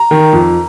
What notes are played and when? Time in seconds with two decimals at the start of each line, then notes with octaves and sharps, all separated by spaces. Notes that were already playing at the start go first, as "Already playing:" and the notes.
Already playing: A#5
0.11 D#3
0.33 F2